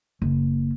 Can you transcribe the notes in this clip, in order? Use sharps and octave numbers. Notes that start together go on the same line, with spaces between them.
F#1